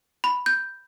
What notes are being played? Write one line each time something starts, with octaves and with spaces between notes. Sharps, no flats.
B5
G6